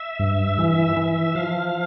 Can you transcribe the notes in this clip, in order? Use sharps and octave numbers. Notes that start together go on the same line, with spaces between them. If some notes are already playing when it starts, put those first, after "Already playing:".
Already playing: E5
G2
E3
E3
F3 F5